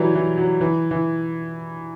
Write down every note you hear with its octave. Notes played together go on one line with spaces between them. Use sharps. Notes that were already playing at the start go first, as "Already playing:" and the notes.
Already playing: E3 F#3 G3
E3
F#3
E3
E3